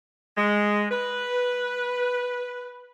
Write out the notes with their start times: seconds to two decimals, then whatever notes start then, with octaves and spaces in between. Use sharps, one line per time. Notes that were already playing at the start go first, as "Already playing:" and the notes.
0.36 G#3
0.91 B4